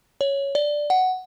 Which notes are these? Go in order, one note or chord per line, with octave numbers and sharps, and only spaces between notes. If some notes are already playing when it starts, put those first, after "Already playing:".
C#5
D5
F#5